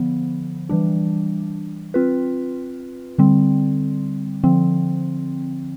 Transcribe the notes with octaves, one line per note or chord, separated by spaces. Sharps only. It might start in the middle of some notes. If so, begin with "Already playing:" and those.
Already playing: D3 F3 B3
E3 G3 D4
C4 F4 B4
D3 G3 C4
D3 F3 C4